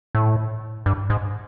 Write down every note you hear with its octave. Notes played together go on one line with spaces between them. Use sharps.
A2
G2
G#2